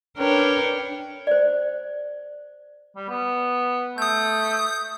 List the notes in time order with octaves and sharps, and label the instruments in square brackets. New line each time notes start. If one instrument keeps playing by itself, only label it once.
[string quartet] D4 A#4 B4 C#5 G5
[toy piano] C5 D5
[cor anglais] G3
B3
[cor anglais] A3 [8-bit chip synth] D#6 G6